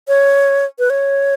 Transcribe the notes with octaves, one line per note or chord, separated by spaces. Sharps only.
C#5
B4
C#5